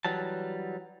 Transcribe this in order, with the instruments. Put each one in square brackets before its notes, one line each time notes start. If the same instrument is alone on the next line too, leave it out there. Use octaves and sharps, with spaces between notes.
[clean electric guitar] E3 F#3 G3 A5